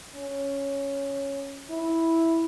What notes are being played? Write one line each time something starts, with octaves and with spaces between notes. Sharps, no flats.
C#4
E4